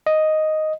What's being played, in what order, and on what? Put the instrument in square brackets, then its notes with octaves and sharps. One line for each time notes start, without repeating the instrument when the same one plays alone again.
[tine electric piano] D#5